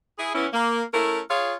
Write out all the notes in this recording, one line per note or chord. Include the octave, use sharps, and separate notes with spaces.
E4 G#4
E3 B3 C#4 E4
A#3
A3 C#4 E4 A#4
F4 G#4 C#5 F5